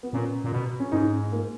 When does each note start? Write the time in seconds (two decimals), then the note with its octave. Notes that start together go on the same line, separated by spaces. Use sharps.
0.03 B3
0.13 A#2 C#4
0.44 A#2
0.52 B2
0.80 C#4
0.92 G#2 D#4
1.32 A#3